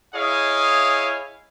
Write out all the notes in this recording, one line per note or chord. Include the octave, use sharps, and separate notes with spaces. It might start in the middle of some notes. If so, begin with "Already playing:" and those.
E4 G#4 C#5 D#5 F5